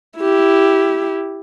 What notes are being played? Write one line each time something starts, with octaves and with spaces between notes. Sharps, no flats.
E4 G4